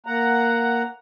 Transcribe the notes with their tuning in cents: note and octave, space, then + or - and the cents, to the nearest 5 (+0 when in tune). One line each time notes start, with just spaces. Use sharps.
A#3 -5 F#5 +5 A#5 +0